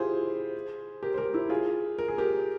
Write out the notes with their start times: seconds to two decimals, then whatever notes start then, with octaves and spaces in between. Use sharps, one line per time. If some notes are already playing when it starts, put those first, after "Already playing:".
Already playing: E4 F4 G4 G#4 C5
1.03 G4 A#4
1.14 C5
1.18 G4 A#4
1.34 E4 G4
1.50 F4 G#4
1.99 A#4
2.08 G#4
2.18 G4 A#4